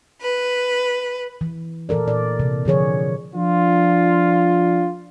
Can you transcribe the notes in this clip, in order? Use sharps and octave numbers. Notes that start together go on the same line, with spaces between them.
B4
E3
A#2 E3 A4 A#4 D5
A#2 D5
C3 E3
D3 F3 G#4 C#5
F3 D4 F4